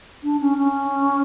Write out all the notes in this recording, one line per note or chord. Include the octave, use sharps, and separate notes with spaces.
D4
C#4
C#4